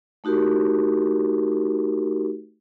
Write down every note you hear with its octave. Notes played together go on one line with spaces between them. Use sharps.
A3 D#4 F#4 G4 A#4